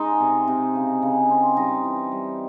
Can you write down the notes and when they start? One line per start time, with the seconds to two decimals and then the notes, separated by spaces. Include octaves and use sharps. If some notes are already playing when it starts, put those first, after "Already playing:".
Already playing: G#3 D#4
0.20 C3
0.48 C3
0.75 C#3
1.02 C#3
1.30 C4
1.57 G3 D#4
1.84 E3
2.12 G3